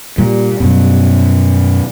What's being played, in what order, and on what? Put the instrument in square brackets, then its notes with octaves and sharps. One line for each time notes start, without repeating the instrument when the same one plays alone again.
[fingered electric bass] A#2 [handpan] G3
[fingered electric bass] F#2 B2